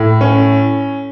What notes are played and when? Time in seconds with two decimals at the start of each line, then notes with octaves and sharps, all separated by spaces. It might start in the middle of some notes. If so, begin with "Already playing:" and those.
Already playing: A2
0.21 C#4